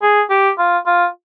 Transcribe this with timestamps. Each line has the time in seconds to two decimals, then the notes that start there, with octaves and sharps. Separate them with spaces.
0.02 G#4
0.31 G4
0.58 F4
0.87 F4